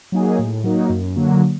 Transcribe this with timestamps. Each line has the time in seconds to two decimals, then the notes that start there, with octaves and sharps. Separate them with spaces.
0.12 F#3 A#3 D#4 G#4
0.39 A2
0.64 F#3 A#3 D#4
0.90 F#2
1.16 D3 F#3 A#3